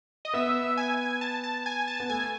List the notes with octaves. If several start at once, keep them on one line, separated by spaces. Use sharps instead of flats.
D#5
B3 E5
G#5
A5
A5
G#5
A5
B3
A3 G#5